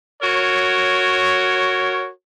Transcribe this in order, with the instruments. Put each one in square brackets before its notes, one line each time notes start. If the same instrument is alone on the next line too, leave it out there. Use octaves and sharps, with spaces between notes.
[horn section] F#4 A#4 C#5